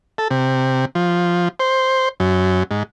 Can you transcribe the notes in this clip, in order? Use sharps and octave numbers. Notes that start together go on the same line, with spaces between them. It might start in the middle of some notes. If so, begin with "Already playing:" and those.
A4
C3
F3
C5
F#2
G#2